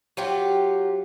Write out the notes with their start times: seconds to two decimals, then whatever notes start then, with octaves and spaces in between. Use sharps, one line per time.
0.17 F#3 F4 G4